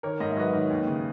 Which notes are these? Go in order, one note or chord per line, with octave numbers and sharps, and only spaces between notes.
D#3 A#4 C#5
G#2 D#5
E5
F#3 B4 D#5
D#3
D#2
C#3